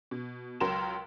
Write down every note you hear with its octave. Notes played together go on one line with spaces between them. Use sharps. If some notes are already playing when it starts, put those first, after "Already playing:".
B2
C#2 F#3 A#4 C6 E7